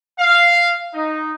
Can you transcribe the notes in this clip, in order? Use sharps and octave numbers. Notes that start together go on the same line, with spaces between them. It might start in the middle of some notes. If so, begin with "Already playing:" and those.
F5
D#4